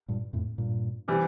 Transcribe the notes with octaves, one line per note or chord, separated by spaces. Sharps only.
G2 A#2
F2 A2
G2 A#2
C3 E3 G3